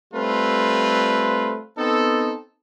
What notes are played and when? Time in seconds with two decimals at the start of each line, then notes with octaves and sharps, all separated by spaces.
0.13 G3 A3 C4 F4 B4
1.78 B3 C4 D#4 A4